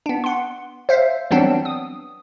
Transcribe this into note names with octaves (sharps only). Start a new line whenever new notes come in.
B3 D4
F#5 C6
C5 E5 F5
E3 F#3 G3 B3 C4 D4
D#6